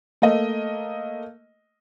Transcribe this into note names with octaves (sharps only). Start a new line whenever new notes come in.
A3 A#3 D#5